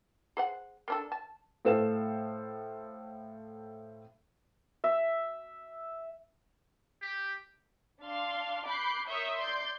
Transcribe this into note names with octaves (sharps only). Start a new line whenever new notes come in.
G#4 C5 F#5
A#3 D4 A4
A5
A2 A4 C5 F5 E7
E5
G4
D4 F5 C6
B5 D6 F#6 G6 C7
A#4 C#5 E5 C#6 D#6 G6
D5 C6 G6